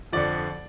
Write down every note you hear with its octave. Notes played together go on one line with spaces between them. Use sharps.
F2 D3 F3 D5